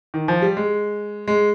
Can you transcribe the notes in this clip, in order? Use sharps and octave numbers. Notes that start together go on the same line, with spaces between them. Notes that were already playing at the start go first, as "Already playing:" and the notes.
D#3
F3
G3
G#3
G#3